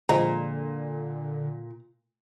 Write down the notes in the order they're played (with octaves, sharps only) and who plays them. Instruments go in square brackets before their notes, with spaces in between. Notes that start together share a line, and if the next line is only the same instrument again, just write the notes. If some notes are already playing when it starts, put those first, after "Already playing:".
[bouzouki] A#2 [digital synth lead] D3 [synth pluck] F3 G#3 [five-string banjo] A#5